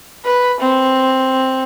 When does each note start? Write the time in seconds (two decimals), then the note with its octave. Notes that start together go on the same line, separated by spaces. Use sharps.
0.25 B4
0.60 C4